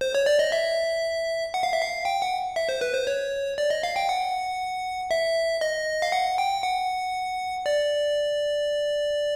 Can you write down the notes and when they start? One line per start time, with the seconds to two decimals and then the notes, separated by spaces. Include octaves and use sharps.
0.01 C5
0.15 C#5
0.26 D5
0.39 D#5
0.52 E5
1.54 F#5
1.63 F5
1.73 E5
1.82 F5
2.05 G5
2.22 F#5
2.56 E5
2.69 C5
2.81 B4
2.94 C5
3.07 C#5
3.58 D5
3.70 D#5
3.83 F5
3.96 G5
4.09 F#5
5.11 E5
5.61 D#5
6.02 F5
6.12 F#5
6.38 G5
6.63 F#5
7.66 D5